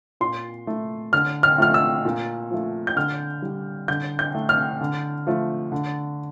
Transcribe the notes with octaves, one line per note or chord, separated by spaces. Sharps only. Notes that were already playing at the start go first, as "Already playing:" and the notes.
A#2 C6
A3
D3 F6
F6
F3 A3 F6
E6
A#2
F3 A3
G6
D3 F6
G3
D3 G6
G6
A3
F6
D3
F3 A3
D3